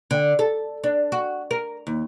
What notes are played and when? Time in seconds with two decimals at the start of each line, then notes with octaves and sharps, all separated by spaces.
0.11 D3
0.39 A4
0.84 D4
1.12 F#4
1.51 A#4
1.87 D#2